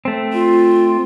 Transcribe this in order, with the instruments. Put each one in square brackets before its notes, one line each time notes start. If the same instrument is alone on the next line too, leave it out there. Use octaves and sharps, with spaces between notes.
[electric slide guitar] A3 C4
[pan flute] F4